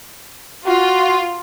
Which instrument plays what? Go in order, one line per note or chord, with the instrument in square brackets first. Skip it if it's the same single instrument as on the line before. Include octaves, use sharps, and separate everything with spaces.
[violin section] F4 [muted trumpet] F#4